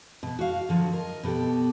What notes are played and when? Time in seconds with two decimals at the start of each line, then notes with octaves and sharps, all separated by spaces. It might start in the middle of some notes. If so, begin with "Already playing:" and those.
0.23 B2 B3
0.39 F#4 F5
0.69 D3 F3 F#3
0.93 A#4 D#5
1.23 B2 B3 G4 A4